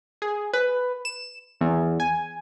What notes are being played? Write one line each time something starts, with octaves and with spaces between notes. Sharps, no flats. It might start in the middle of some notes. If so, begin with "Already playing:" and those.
G#4
B4
E7
E2
G#5